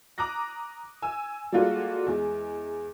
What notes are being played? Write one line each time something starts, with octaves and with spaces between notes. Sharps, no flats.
A#5 D6 D#6 F#6 A#6
G#5 E6
G3 G#3 A#3 F4 F#4 A4
E2 G#3